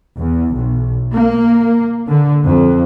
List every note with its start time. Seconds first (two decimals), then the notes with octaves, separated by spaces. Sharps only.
0.18 E2
0.54 B1
1.13 A#3
2.08 D3
2.45 F2